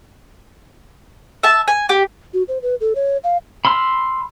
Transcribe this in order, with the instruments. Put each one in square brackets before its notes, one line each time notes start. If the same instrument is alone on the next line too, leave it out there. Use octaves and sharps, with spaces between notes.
[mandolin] E5 A5
G#5
G4
[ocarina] F#4
C5
B4
A4
C#5
F5
[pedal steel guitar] B5 C6 E6 F6